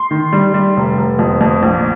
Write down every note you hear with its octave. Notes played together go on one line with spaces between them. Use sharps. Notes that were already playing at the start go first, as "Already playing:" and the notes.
Already playing: C6
D#3
G3
G3
F1
F1
F2
F2
A#1